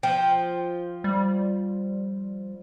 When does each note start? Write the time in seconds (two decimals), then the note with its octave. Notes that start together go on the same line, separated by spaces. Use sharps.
0.03 F3 G5
1.04 G3